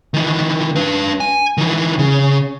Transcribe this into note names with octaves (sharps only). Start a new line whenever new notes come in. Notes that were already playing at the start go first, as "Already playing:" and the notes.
D#3 E3
D4 B4
G#5
D#3 E3
C#3